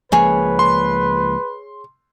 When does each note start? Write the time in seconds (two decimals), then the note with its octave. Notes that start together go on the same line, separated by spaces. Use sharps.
0.12 C#2 F3 A#3 G#4 B4 C#5
0.59 C6